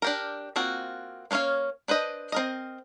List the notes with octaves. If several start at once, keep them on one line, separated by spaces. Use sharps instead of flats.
D4 G4 A#4
A#3 C4 F4 F#4
A#3 B3 C#4 C#5 F5
D4 B4 C5 D#5
C4 A#4 D#5